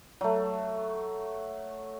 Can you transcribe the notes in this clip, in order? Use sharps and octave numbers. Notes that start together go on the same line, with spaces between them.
F#3 A3